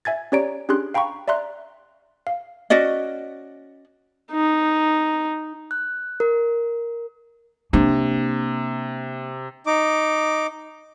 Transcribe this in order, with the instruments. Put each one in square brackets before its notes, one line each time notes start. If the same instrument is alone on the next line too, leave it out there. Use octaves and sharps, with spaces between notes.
[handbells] E5 G#5 G#6 A6
C#4 G4 C#5 D5 A#5 D7
C#4 D4 G4 G#4 C6 F#6
F5 G5 A#5 B5 C#6
D5 E5 A#5 C6 F#6
F5
[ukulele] C#4 F#4 D5 D#5
[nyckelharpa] D#4
[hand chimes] F#6
A#4
[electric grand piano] C3 [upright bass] A#3 D4
[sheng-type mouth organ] D#4 D6